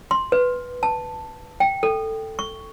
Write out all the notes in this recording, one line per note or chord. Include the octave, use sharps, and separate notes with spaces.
C6
B4
A5
G5
A4
C#6